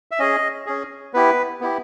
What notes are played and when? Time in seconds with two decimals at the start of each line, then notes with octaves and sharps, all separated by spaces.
0.11 E5
0.19 C#4 G#4 D#5
0.66 C#4 G#4
1.14 B3 E4 G4 B4
1.61 B3 E4 G4